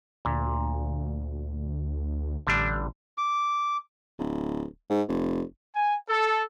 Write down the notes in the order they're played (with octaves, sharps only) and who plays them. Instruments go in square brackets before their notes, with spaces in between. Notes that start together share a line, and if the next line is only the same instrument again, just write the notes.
[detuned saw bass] D2 [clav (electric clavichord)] A#2
[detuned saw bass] A1 [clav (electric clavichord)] D3 G3 D4
[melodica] D6
[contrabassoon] D1
G#2
F1
[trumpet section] G#5
A4